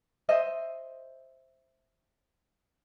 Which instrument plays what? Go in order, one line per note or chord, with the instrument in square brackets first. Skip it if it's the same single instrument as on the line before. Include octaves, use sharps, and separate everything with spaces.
[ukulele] C5 D#5 E5